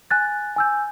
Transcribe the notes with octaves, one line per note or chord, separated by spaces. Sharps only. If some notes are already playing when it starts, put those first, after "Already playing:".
G#5 F#6 A6
G#5 E6 G6